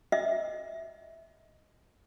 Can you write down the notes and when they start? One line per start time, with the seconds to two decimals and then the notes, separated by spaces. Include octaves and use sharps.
0.12 D#5 E5